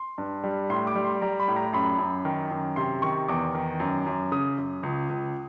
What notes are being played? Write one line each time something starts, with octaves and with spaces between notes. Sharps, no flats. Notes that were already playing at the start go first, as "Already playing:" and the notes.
Already playing: C6
G2
G3
A2 C6
D6
G3
C6
G3 A#5
B5
A2
A#5
F#2 B5
F#2
D#3
F#2
C3 C6
D#3 C#6
E2 D6
D#3
F#2
F#2
C#3 D#6
F#2
C#2
C#2